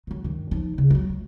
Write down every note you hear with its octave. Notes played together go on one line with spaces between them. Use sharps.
D#3 F#3
G2 D#3
F3 D#4
C#3
F#3 G3
A3